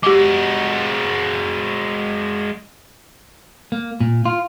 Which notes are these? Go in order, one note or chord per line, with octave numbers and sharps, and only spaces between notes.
G#3 F#4 G4 D6
A#3
A#2
F4